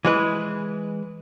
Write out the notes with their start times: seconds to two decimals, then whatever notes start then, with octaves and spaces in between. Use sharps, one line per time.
0.05 E3 G#3 B4